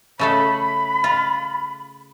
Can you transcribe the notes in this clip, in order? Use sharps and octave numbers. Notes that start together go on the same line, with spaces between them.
C#3 A3 A4 B5
F4